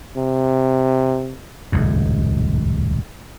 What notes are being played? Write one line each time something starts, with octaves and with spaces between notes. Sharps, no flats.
C3
D#1 C#2 F#2 A2